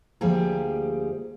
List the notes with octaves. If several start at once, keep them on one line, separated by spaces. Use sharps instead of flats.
D2 F3 G3 A#3 G4 G#4